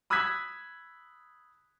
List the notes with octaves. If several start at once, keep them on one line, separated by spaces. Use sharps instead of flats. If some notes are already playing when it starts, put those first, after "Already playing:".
B5 D#6 E6 F#6 G#6 B6